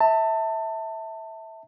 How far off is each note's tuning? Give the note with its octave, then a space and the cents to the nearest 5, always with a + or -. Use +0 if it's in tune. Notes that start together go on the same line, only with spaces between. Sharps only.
E5 -20 A5 +25